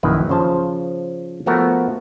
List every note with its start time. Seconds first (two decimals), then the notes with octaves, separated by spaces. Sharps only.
0.03 A#1 F#2 D#3 E4 B4
0.29 C#3 F3 C5 A5
1.46 F3 A3 B3 F#4 A#4